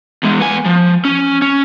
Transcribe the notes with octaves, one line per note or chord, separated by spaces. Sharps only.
E2 G#3
B3 G#5
F3
C#4
C#4